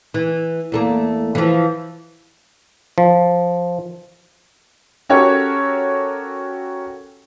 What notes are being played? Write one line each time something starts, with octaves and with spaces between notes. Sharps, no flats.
E3
E2 A3 A#3
E3 F3
F3
C#4 F#4 G4 A4 A#4 C#5